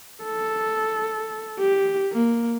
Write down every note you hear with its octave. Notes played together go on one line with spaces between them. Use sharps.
A4
G4
A#3